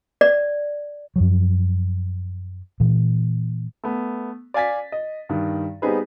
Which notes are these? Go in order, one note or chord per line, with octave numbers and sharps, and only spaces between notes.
D5
F#2 F3 F#3
A#2 E3
A3 B3
D5 F5 G#5 A6 B6
D#5
G2 D#3
G3 B3 C4 D#4 G#4 B4